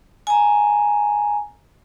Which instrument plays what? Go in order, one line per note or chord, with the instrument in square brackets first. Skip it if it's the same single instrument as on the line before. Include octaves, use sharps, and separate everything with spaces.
[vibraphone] G#5 A#5